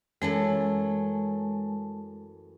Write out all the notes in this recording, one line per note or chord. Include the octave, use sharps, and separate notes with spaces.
F#2 E3 G#3 A3 A5